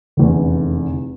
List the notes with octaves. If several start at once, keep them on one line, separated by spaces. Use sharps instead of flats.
F1 E2 D3